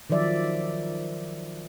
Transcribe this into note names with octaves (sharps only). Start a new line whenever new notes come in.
D#3 F3 F#3 D5 E5